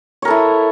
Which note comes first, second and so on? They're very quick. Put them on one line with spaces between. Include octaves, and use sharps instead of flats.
C#5 A#4 A4 E4